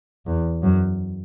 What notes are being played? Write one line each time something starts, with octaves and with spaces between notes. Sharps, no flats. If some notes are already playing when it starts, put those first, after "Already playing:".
E2
F#2